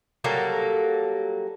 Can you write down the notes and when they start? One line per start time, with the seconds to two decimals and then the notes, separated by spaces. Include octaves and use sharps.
0.24 F#3 G3 A#3 A4